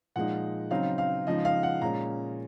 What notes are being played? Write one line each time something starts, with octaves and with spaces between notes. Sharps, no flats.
A#2 F3 G#3 D#4 F#5
C#3 F#3 C4 D#4 F5
F5
C#3 F3 G#3 D#4 D#5
F5
F#5
A#2 G#3 C#4 A#5